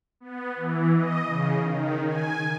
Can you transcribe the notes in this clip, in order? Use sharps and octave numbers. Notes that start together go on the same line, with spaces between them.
B3
E3
D#5
C#3
D#3
G#5